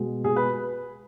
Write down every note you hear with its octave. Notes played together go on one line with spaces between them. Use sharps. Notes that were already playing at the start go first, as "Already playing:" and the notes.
Already playing: B2 G#3
G#4
B4